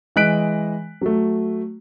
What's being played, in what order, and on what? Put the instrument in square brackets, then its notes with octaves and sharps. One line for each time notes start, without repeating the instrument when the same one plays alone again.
[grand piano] E3 G#3 D#5 F#6 B6 D7
F#3 A3